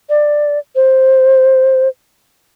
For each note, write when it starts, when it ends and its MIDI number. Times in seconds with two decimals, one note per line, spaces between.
0.09 0.59 74
0.76 1.88 72